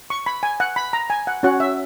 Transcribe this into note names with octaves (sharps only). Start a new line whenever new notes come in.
C#6
B5
G#5
F#5
B5
A#5
G#5
F#5
C#4 F#4 C#5 F#5
E5